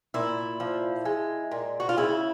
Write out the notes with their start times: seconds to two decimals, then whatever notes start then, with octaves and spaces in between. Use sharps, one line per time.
0.14 A#2 E4
0.60 F3
1.05 G#3
1.51 A#2
1.80 F#4
1.89 F4
1.97 C#3 E4